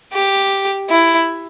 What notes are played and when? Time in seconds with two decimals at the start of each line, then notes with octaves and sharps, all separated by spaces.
0.13 G4
0.90 E4